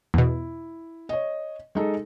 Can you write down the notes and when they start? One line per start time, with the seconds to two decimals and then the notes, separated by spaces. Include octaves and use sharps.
0.14 E2 B2 E4
1.09 C#5 D#5
1.75 G#3 D#4 A4